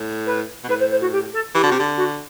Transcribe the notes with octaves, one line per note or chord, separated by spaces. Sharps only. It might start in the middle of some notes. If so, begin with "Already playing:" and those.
Already playing: A2
B4
B2
A2 B4
C5
C5
F#4
G4
A4
E3 G4
D3 F#4
C3 G4
D3
F#4